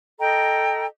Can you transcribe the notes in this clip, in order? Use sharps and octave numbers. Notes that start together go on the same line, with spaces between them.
A4 D#5 G5 A#5